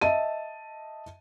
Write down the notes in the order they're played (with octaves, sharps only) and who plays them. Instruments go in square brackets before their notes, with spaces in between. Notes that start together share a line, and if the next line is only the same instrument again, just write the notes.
[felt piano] D#5 E5 A5 D#7